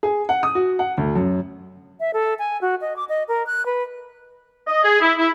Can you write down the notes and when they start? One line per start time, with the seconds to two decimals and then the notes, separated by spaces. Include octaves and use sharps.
0.03 G#4
0.29 F#5
0.43 D#6
0.55 F#4
0.79 F#5
0.97 D2
1.16 F#2
2.00 E5
2.13 A4
2.39 G#5
2.61 F#4
2.81 D#5
2.96 D6
3.09 D#5
3.28 A#4
3.46 F#6
3.66 B4
4.67 D#5
4.83 G#4
5.01 E4
5.18 E4